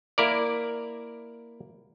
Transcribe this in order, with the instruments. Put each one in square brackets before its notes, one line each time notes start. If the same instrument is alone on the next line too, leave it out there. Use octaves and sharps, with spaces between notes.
[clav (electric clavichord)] A#3 E4 A#4 D5